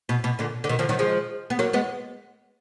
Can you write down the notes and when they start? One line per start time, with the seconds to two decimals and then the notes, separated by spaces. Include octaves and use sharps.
0.09 B2
0.24 B2
0.39 A#2 D3
0.64 D3
0.69 B2 D#3
0.79 D3 F3
0.89 D#3 F#3
0.99 F3 G#3
1.50 B3
1.59 F#3 A#3
1.73 G#3 B3